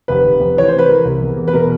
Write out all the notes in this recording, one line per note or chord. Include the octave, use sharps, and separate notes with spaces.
F1 B4
F1
F1
E3 C#5
C3 C5
B4
E3 A#4
C2
E2
E2
B4
B2 A#4